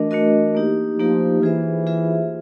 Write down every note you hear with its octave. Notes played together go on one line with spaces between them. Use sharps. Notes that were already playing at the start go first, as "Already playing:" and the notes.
Already playing: E3 A3 D4 F#4 A#4 D#5
A3 D4 F#4 A#4 D#5
A#3 D#4 G4
F3 A#3 D#4 G4
E3 F4 G#4 C5 E5
F4 G#4 C5 E5